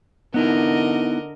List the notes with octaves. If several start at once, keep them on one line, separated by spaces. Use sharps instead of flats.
D3 B3 D#4 E4 A#4 D#5